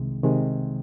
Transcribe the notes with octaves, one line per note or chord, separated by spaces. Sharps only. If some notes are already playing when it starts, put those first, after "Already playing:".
Already playing: C2 C3 D#3 G#3
C3 D#3 G#3